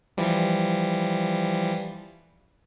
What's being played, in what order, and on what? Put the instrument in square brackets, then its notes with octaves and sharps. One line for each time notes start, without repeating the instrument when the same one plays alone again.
[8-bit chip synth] E3 F3 G3